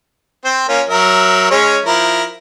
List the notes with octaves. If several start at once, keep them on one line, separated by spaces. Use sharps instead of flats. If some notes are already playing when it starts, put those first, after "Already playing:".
C4 C5
A#3 C#4 F4
F#3 A#4 E5
G#3 C#4 C#5
F3 E4 A#4